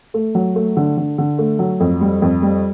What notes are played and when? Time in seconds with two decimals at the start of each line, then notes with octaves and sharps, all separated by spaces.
0.14 A3
0.35 F#3
0.56 A3
0.77 D3
0.97 D3
1.18 D3
1.39 A3
1.59 F#3
1.80 F2
2.01 G3
2.22 F2
2.42 G3